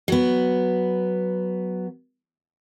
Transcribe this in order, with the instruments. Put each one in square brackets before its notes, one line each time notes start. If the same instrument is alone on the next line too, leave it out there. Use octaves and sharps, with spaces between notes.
[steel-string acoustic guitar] F#3 B3